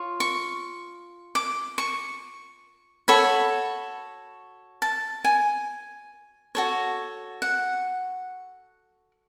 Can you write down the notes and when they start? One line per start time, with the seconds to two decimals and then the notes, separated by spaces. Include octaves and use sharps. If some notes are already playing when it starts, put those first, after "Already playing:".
Already playing: F4 C#5
0.20 C#6
1.35 D6
1.78 C#6
3.08 F#4 A4 C#5 B5
4.82 A5
5.24 G#5
6.55 F#4 A4 C#5
7.42 F#5